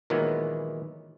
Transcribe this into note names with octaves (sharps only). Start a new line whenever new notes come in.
A#2 D#3 E3 F#3 G#3 B3